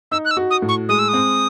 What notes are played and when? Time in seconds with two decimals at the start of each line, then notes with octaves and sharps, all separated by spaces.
0.12 D#4 E6
0.25 F#6
0.31 E6
0.37 F#4
0.51 D#6
0.62 A2
0.69 C#6
0.89 G#3 D#6
0.99 E6
1.09 C4 D#6